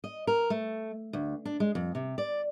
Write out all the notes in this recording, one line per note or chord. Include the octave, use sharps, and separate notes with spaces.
D#5
A#4
A3
D2
D4
G#3
F2
C3
D5